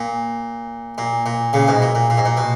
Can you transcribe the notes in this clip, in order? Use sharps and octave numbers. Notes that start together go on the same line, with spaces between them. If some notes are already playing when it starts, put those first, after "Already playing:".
Already playing: A#2
A#2
A#2
A#2 C#3
G#2 B2
A#2
A#2
A#2
G#2
A#2
B2